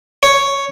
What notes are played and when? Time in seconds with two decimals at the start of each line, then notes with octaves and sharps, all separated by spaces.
0.23 C#5